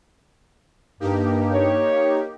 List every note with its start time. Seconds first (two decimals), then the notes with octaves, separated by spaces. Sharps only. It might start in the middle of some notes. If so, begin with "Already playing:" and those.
1.00 G2 A#3 D#4 G4
1.53 C#5